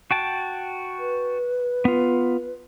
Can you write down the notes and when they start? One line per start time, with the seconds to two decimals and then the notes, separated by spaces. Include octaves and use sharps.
0.11 F#4 G5 A5
0.99 B4
1.85 B3 F4